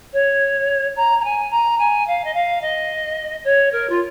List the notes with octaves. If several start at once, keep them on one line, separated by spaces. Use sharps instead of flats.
C#5
A#5
A#5
G#5
A#5
G#5
F5
D#5
F5
D#5
C#5
A#4
F4